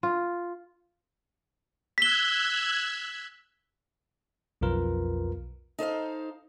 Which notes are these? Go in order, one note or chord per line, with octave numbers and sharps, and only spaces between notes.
F4
E6 F#6 G#6 B6 G7
B1 F2 F4 A#4 B4
D#4 A4 C5 F5